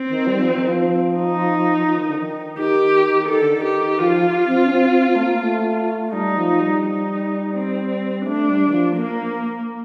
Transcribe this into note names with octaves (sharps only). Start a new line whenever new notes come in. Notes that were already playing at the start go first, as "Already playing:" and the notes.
Already playing: C4
D#3
G3
F3
D#3
F3
D#4
F3
D#3
D3
D#3
D#3 G4
D#3 A4
D3
D#3
G4
F3 F4
C4
D4
C4
C4
C4
A3
A#3
A3
G3 D#4
F3
G3
D#4
C4
A3 D4
G3
D#3
F3
A#3